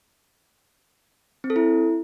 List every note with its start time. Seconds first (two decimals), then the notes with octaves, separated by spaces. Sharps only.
1.44 C4
1.50 A4
1.56 E4